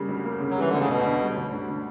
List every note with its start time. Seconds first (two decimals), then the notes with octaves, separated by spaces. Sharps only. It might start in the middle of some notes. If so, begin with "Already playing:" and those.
Already playing: C#3 G3 A#3
0.09 D2
0.24 A#3
0.40 C#3
0.50 F#3
0.57 E3 G3
0.69 D2 D3
0.79 C#3
0.88 D2 B2
1.05 D3
1.21 G3
1.36 D2
1.53 D2
1.69 D3